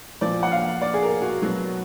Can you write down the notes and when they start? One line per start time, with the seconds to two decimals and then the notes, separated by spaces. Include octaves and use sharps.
0.21 A#2 F3 D5
0.43 F#5
0.51 F5
0.82 D5
0.94 G#4
1.02 A#4
1.22 F#4
1.42 B2 F#3 F#4